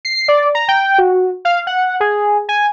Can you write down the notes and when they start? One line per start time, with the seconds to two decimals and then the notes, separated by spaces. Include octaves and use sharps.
0.05 C7
0.28 D5
0.55 A#5
0.68 G5
0.98 F#4
1.45 F5
1.67 F#5
2.00 G#4
2.49 G#5